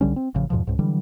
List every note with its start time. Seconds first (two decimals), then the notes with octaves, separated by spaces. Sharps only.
0.01 C2 D3 G3 C#4
0.16 C4
0.35 A1 C#3 F3
0.50 E2 G#2 B2 F3
0.67 C#2 G#2
0.79 D3 E3 F#3 G3